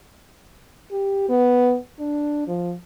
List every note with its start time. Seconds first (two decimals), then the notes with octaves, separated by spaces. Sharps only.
0.91 G4
1.29 B3
1.99 D4
2.48 F3